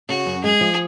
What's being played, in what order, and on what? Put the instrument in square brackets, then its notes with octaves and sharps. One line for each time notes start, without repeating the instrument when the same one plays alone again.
[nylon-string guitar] C#3 [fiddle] F#4
[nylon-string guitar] F#2
[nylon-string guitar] G#3 [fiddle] G#4
[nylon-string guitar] F3